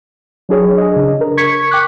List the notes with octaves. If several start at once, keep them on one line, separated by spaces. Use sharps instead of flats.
F#3 D4 G#4 C#5
G#4 D#5
C#3 D4
A#4
C#6 G#6 B6 C#7
G5 D6 F#6